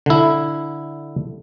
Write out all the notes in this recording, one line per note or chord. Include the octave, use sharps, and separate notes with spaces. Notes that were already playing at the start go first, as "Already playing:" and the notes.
D3 E4